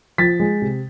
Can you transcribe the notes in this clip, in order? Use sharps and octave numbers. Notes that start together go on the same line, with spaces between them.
F3 A6 B6
G#3
C3